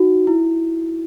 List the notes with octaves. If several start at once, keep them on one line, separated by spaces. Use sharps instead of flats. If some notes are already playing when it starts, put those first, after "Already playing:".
Already playing: D#4 F#4
E4